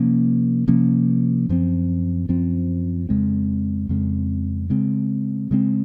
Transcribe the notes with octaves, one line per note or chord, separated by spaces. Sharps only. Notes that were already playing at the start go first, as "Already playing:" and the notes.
Already playing: C3 F3 A#3 C#4
C3 F3 A#3 C#4
F#2 F3 C4
F#2 F3 C4
F2 C#3 G#3 C4
F2 C#3 G#3 C4
C#3 G#3 C4
C#3 G#3 C4